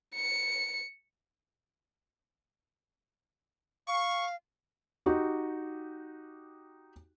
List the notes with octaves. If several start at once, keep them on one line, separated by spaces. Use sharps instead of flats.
C#7
F5 C#6
D#4 F#4 G4